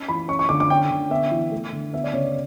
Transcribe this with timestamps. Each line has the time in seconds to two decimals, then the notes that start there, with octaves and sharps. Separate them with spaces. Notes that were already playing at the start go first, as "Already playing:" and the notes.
Already playing: C#4
0.09 E3 B5
0.28 C#4 C#6
0.39 C#6
0.49 D3 D6
0.60 D6
0.70 C#4 G5
0.91 D3
1.10 B3 E5
1.31 E3
1.52 A3
1.73 D3
1.93 B3 E5
2.04 D5
2.13 C#3 C#5
2.24 D5